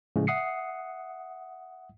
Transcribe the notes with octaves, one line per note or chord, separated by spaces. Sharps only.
A2 C#3 F3 G#3
E5 F#5 D#6 C7 C#7